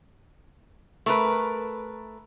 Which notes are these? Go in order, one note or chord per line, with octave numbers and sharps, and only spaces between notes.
A3 A#4 B4